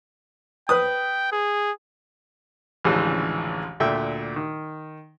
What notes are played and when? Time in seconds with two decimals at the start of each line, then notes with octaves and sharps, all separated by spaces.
0.69 B4 G5 D#6
1.32 G#4
2.85 A1 D2 C#3 E3 F3 G#3
3.80 D2 A#2 A3 E5 G5
4.36 D#3